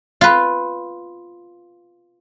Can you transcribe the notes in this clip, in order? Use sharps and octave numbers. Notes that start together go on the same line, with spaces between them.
F4 B4